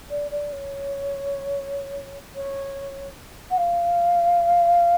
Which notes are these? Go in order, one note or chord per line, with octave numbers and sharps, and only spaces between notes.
D5
D5
C#5
C#5
F#5
F5